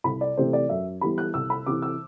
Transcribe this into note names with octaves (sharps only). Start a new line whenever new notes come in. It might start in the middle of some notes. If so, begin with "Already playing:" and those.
C2 B5
D5
C3 E3 A3 C5
D5
F#2 E5
E3 G3 B3 B5
F#6
C2 E6
B5
C3 E3 D6
E6